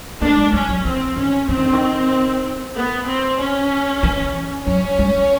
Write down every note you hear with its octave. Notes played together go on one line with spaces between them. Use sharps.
A#3 D4
G#3
G3 C#4
F#3
E3 C4
D#3 C#4
E3 C4
D#3
D3
D#3
B3
C4
C#4
E3
F#3 C#4
G3